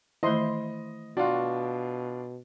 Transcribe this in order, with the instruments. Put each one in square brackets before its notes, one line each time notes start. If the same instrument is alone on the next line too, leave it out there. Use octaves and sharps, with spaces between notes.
[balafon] D#3 E3 A3 [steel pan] E4 C5 C6 [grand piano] D#5
[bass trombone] B2 [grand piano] D4 F4 [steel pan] F#4